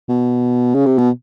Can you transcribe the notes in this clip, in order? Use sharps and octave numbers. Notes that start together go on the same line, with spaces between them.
B2
C#3
C3
B2